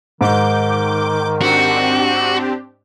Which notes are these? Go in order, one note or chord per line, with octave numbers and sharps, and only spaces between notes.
G#2 D#3 D6 G6
C4 D4 F#4 G4